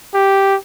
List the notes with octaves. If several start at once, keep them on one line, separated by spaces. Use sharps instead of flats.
G4